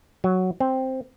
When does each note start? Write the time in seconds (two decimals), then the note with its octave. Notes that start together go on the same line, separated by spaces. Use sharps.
0.24 F#3
0.60 C4